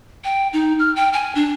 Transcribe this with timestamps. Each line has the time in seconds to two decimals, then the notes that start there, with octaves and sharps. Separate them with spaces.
0.24 G5
0.53 D#4
0.79 F6
0.96 G5
1.13 G#5
1.35 D4